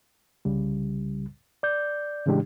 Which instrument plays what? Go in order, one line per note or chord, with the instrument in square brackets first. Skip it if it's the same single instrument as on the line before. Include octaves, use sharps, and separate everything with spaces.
[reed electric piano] C2 C#3 G3
D5 G6
A2 C#3 E3 G#3 D4 G4